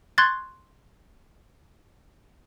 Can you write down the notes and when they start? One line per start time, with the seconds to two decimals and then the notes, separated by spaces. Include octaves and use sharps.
0.18 C6 C#6 F#6 G#6 A6